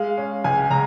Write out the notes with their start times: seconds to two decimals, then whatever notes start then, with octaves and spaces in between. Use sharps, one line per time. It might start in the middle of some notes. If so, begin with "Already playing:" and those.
Already playing: G#3 F5
0.18 C#4
0.44 C#2 G#5
0.70 C#3 A#5